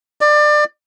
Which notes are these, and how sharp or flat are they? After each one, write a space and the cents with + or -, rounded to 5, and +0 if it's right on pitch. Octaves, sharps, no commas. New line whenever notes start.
D5 +25